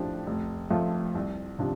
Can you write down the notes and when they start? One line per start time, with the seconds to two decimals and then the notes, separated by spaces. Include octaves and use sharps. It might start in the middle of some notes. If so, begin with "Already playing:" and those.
Already playing: A2 F3 D4 G4
0.27 F1
0.71 F2 F3 A3 F4
1.15 C2
1.59 C3 F3 D4